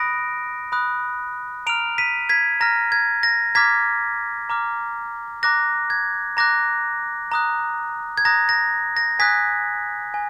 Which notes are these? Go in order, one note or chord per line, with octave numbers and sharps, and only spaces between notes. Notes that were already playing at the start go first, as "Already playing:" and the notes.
Already playing: B5 D#6 F#6 A#6 D7
B5 D#6 F#6
A#5 F6 D7 F7
B6 D#7
G#6 B6
A#5 F6 A#6
G#6
A#6
A#5 D6 F6 G#6 B6
A#5 D6 F6
A#5 D6 F#6 A#6
G#6
A#5 D6 F#6 A#6
A#5 D#6 F#6
G#6
A#5 D#6 F#6 A#6
A#6
A#6
G#5 D#6 F#6 G#6 B6
G#5